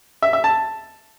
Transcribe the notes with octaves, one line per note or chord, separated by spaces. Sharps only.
E5
E5
A5